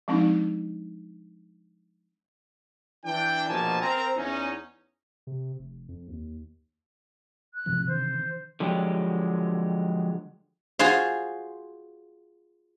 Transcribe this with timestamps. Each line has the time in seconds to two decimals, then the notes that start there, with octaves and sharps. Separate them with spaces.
0.08 F3 G#3 C4 D4 D#4
3.05 E3 D4 G5
3.48 A#1 B2 F3 A#3 G#5 A5
3.81 C4 A#4 A#5
4.16 E2 C#4 D#4
5.27 C3
5.59 F1
5.89 F2
6.08 D#2
7.54 F#6
7.66 A#1 G#2 C3 F3
7.88 D#3 E3 D4 C5
8.60 D3 F3 F#3 G#3 G4
10.79 F4 F#4 G#4 C5 F5